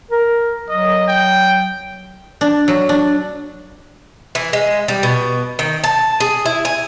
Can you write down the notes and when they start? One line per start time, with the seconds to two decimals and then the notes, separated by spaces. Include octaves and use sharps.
0.11 A#4
0.69 F#3 D#5
1.07 G5
2.41 D4
2.68 F#3
2.89 D4
4.35 E3
4.53 G#3
4.88 G3
5.03 B2
5.59 D#3
5.84 A5
6.20 G#4
6.46 E4
6.65 G#5